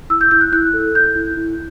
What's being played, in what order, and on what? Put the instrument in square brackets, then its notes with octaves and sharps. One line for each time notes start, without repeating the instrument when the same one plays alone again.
[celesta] E4 E6
G6
E4 G6
F#6
E4 F#6
A4
E4 G6
E4
E4